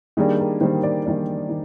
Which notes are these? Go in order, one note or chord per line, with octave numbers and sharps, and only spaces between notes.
D#3 G3 A#3 D4 G#4
A#4
D#3 G3 A#3 D4 C5
D5
D#3 G3 A#3 D4 D5
D#3